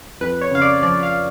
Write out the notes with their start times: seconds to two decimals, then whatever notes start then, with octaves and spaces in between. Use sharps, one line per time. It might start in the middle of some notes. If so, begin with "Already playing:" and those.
0.20 F2 B4
0.41 C#5
0.51 C#3 F5
0.61 D5
0.82 F3 D5
1.03 F5